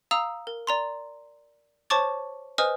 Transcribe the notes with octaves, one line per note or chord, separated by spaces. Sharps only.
F5 A#5 D#6 E6 F7
A#4
D5 A#5 C6
C5 C#5 A5 C#6 D6 A6
B4 C5 D#5 G#5 D#6 F6